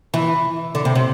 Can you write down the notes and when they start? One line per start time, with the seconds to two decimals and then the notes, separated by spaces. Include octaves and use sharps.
0.14 E3
0.75 D3
0.85 C3
0.95 C3